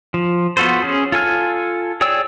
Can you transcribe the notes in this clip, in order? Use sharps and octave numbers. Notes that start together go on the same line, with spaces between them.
F3
B3 F4 F#4 A4 C5
C#4 G#4
F4 A4 G#5 F6
G#4 C#5 D5 G5 E6